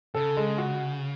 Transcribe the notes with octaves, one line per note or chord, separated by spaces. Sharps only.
C#3 A4
G#3
F#4